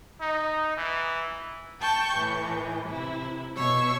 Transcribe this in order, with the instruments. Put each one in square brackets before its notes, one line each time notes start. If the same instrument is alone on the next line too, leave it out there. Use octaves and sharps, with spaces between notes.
[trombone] D#4
E3
[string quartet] G5 A5 C#6 G6
A2 E3
C3 E4
B2 C#5 C#6 E6